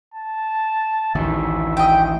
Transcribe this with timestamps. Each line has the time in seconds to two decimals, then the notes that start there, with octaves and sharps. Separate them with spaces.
0.14 A5
1.15 A1 D2 D#3 E5
1.77 D#5 G5